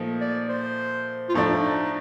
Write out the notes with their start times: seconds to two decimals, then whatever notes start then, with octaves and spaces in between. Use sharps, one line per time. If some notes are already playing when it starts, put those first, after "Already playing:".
Already playing: A#2 F3 A3 D#4
0.21 D5
0.49 C5
1.29 F4
1.34 A2 F3 A3 D4 D#4
1.62 D#4
1.83 D#4